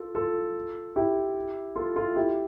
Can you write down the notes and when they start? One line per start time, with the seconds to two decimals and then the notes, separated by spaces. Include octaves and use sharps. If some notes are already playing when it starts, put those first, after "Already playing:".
Already playing: F4 A4
0.15 F4 A4
0.96 E4 G4
1.76 F4 A4
1.96 F4 A4
2.16 E4 G4